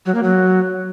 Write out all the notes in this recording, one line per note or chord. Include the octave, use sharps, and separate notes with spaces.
F#3
A#3
F#3